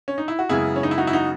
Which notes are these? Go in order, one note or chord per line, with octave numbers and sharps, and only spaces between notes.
C#4
D#4
E4
F#4
F#2 C#3 G#3 B3 E4 G#4
C#4
D#4
E4
D#4 F#4
E4
D#4 F#4